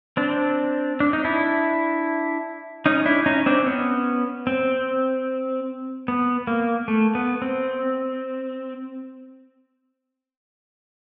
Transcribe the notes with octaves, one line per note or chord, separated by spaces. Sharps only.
C4 D4
D4
D#4
D4 E4
C#4 D#4
D4 E4
C#4 D#4
C4 D4
B3 C#4
C4
B3
A#3
A3
B3
C4